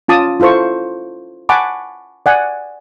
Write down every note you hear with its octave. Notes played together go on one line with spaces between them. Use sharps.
C#4 F4 A5 D6 D#6
E4 F4 A4 C5 C#6
F#5 G#5 A5 B5 C#6 D6
D5 F#5 G#5